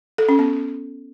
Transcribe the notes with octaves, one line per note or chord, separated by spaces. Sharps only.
A4
C#4
B3